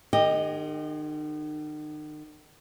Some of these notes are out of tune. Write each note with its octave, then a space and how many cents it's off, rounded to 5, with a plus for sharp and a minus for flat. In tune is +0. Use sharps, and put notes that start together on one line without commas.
D#3 -40 G4 +25 D#5 +0